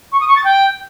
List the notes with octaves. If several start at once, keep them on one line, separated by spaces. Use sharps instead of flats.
C#6
D#6
C#6
A6
G5